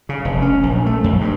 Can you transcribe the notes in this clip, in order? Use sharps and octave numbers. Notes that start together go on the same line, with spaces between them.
C#3
F1
C#4
A#1
A3
F2
G2